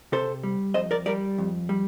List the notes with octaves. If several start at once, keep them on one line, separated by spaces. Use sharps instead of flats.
C3 A4 C5
G3
F2 C5 D#5
A#4 D5
G3 A#4 D5
F2
G3